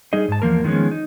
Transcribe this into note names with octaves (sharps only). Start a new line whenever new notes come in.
G3 D#4 G#4 D#5
G#2 A5
E2 F3 A#3 A#4
D#3 F3 G#3 B3 C#4
D#4